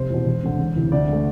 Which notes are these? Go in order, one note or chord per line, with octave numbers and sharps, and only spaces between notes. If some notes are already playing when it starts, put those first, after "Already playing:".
Already playing: F1 C5
E2 B2
E1
D2 D3
E1
D2 C3 E3
D2 D5
D3 A3